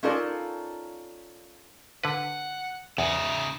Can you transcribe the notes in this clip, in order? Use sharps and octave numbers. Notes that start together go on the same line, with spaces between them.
C#4 D#4 F4 A4 A#4 D5
D3 B4 F#5
E2 C#3 D#4 E5